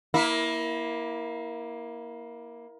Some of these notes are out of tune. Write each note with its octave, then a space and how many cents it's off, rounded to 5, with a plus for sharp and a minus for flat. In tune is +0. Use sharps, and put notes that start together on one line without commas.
A#3 +15 E4 -15